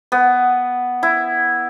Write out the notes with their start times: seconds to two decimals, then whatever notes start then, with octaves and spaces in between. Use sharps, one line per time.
0.12 B3
1.03 E4